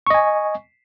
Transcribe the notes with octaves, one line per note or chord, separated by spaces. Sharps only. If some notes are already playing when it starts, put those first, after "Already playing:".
D#5 G#5 C#6